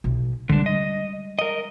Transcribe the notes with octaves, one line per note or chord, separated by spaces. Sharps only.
B1
D3 G3 G#3 D4
D#5
A#4 D#5